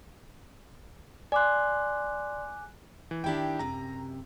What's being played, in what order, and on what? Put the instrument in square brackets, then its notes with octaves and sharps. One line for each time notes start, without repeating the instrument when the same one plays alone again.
[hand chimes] D5 C6 [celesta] G#5 D6 F#6
[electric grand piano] E3
[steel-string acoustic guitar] D#3 G4 [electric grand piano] D4 E4 G5
[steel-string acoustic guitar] F#2 C3 [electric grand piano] A#5